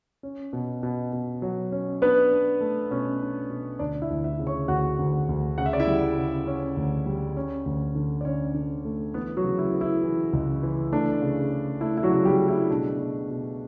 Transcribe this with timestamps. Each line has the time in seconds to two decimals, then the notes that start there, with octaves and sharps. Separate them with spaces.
0.23 C#4
0.53 B2
0.83 B2
1.13 B2
1.42 F#3
1.72 C#4
2.02 B3 D4 B4
2.31 D4
2.61 A3
2.91 B2 C#4 C#5
3.20 D4
3.50 B2
3.79 D2 D4 D5
4.02 E4 E5
4.10 D2
4.24 E4 E5
4.39 C#3
4.47 C#5 C#6
4.68 D2 F#4 F#5
4.99 D2
5.29 D2
5.58 C#3 F#5
5.66 E5
5.73 D5
5.80 E4 E5
5.87 G3
6.18 C#3
6.47 C#4
6.77 D2
7.06 G3
7.36 C#4
7.66 D2
7.95 D3
8.21 D5
8.25 D3 C#4 C#5
8.54 D3
8.85 A3
9.14 E3 B3 B4
9.37 F#3 F#4
9.44 C#3
9.58 E4
9.73 B3
9.81 E4
10.03 E3
10.33 C#2
10.63 E3
10.92 A3 D4
11.22 C#3
11.51 C#3
11.81 A3 E4
11.97 E4
12.03 F#3 F#4
12.11 C#3
12.25 G3 G4
12.40 A3
12.48 E4
12.70 B2 D4
13.00 B2
13.30 B2